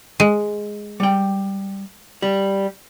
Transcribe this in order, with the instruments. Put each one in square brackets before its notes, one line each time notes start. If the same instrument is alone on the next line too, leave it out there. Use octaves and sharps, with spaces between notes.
[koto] G#3
[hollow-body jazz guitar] G3 G5
G3